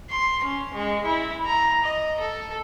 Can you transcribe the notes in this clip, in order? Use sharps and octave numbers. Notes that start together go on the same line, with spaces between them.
C6
C#4
G#3
E4
A#5
D#5
A4